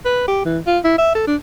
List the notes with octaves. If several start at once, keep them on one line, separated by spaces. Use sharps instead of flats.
B4
G4
E3
F4
E4
E5
A4
D4